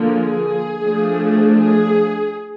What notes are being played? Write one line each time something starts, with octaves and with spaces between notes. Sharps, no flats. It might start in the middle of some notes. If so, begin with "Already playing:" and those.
Already playing: D3 F3 A#3
G#4
F3 A3 D4
G#4